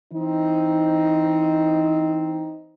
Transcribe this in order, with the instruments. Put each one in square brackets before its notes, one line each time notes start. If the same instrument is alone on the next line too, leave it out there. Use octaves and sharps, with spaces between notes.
[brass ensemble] E3 C4 D#4